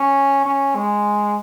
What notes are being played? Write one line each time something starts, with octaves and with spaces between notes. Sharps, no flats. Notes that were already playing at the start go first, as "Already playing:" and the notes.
Already playing: C#4
C#4
G#3